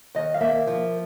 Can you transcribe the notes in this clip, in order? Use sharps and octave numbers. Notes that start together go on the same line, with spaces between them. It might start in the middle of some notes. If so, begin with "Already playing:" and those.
D#2 D#5
F5
A#3 E5
F3